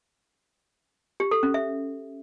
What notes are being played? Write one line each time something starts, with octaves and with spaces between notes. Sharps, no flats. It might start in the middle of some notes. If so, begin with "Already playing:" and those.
G4
A4
C#4
E5